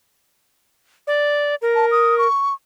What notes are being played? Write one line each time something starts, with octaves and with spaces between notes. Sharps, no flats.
D5
A#4
A5
D#6
C#6